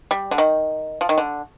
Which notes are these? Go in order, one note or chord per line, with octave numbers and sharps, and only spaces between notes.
G3
D3
D#3
F3
D#3
D3